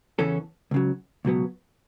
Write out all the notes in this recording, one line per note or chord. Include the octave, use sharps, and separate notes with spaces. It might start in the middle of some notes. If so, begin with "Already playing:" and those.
E2 C#3 E3 C#4 A4
C#2 C#3 F#3
C#2 B2 F#3 B3